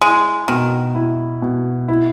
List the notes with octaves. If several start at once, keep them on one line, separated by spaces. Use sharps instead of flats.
G#3 E4
B2 D#3
E4
B2
E4